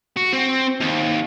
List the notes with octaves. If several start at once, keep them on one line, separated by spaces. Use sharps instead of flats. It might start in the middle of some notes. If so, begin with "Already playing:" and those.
F#4
C4
D#2